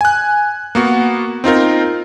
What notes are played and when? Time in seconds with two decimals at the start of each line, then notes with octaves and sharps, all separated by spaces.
0.01 G#5 F#6
0.75 A#3 B3 F#4
1.44 C4 D#4 F4 A#4